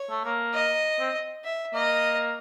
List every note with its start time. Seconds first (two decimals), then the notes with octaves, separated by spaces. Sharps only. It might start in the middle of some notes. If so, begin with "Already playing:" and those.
Already playing: C#5
0.10 A3
0.25 A#3
0.54 D#5
0.99 C4
1.44 E5
1.74 A#3 D#5